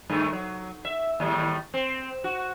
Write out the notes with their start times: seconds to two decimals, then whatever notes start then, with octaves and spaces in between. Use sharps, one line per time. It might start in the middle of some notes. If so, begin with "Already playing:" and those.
0.10 G2 D#3 A3
0.32 F#3
0.85 E5
1.20 D#2 A2 G3
1.74 C4
2.24 F#4